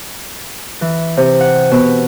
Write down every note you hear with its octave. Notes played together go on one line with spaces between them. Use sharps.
E3
C3
F#5
B2